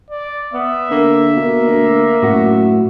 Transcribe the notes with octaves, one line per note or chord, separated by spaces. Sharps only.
D5
B3 E5
D3 A#3
B2 A#3
D2
F#2 A2 F#4 F#5